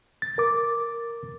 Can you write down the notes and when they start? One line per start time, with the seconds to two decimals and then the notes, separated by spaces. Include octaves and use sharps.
0.22 A6
0.38 A#4 D6